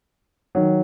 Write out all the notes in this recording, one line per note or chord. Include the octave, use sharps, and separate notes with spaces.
D#3 F#3